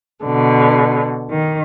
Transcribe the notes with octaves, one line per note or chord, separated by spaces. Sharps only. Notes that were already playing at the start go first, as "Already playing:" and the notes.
B2 D3
D#3